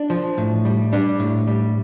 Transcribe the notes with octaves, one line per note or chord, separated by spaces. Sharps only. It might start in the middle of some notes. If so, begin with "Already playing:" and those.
Already playing: D4
F3
A2
G3
G3 D4
A2
G3